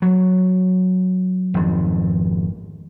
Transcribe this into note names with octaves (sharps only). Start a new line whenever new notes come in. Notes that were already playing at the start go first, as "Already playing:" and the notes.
F#3
G#1 F2